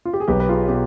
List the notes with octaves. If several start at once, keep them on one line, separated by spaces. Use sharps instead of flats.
F4
G4
G#4
B1 G4 B4
B4
F4 G#4
B2 G4